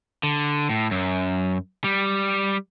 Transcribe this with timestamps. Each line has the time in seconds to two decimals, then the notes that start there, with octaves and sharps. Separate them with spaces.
0.23 D3
0.69 A2
0.91 F#2
1.84 G3